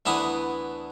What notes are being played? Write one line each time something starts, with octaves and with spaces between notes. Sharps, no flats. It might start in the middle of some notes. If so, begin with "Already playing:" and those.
D2 E3 B3 D4 E4 D#6